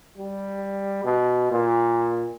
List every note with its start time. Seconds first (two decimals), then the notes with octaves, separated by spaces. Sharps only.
0.18 G3
1.04 B2
1.52 A#2